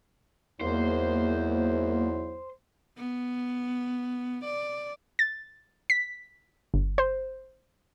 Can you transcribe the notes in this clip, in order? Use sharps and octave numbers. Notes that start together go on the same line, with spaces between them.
E2 G#2 F#3 A#3 E4 C5
B3
D5
A6
B6
G1
C5